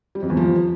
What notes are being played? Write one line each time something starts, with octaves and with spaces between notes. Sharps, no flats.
G3
F2
E2
F3